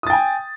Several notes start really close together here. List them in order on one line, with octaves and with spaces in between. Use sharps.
D#6 A6 G5 G#5